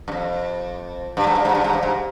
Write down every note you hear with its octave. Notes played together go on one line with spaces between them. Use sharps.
G2
F2
G2
G#2
G2
G#2
G2
G#2
G2
G#2